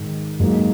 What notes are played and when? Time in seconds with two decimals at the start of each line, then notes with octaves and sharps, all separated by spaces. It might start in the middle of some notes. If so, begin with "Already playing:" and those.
Already playing: G#2 D#3
0.40 G#2 F#3 A#3